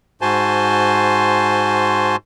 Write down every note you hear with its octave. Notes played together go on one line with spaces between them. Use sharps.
G#2 F#4 C5 G#5 A5 C6